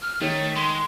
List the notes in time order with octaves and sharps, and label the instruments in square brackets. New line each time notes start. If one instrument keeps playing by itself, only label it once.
[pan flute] F6
[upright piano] D#3 [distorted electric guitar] A3 [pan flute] C#5
[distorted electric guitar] G#3 [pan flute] C6